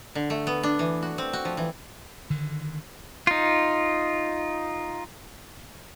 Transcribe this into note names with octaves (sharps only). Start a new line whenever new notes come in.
D3
A3
B3
D4
E3
F#4
C4
F#4
F3
E3
D3 D#3
D#4 F4